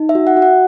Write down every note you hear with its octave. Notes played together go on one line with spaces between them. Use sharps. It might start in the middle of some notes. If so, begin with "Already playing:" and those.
Already playing: D#4
E5
F#4
F#5
F#4
F#5